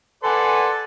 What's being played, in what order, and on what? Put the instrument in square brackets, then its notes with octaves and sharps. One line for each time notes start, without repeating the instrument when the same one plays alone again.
[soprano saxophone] A4 [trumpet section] B4 F#5 G#5 [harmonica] D5 C6